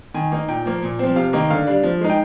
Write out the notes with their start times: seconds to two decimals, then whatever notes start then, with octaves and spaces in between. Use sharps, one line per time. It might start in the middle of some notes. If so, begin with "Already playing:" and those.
0.14 D#3 G#5
0.32 A#3 D#4
0.49 A#2 G5
0.66 F3 A#3
0.83 A#2
0.99 F3 C4
1.16 C3 F5
1.33 D#3 A#3 D#4
1.50 D3 F5
1.67 G3 D4
1.83 F3
2.01 G#3 D#4
2.10 G5